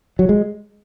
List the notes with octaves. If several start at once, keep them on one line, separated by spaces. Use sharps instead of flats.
F#3
G#3